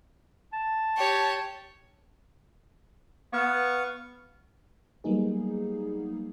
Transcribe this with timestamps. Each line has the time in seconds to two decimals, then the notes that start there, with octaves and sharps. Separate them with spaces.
0.53 A5
0.97 G4 C#5
3.33 B3 F5 C#6
5.04 F#3 G3 A#3 B3 D#4 G#4